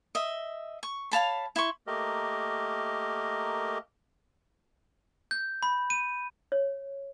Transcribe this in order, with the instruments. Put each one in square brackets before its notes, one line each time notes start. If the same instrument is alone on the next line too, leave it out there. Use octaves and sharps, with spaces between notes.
[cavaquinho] D#5 E5
C#6
C#5 F5 A5 B5
E4 C6 C#6
[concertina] A3 A#3 G4 A#4 D#5
[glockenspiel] G6
B5
D#7
[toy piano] C#5